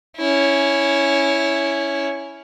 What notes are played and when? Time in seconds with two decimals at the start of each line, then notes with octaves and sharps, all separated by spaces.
0.17 C#4 E4